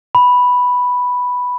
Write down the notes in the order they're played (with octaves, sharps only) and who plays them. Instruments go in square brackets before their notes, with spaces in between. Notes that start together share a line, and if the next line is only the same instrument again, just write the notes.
[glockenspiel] B5